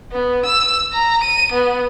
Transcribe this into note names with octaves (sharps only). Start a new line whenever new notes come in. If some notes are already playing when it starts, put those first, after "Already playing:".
B3
E6
A#5
D#7
B3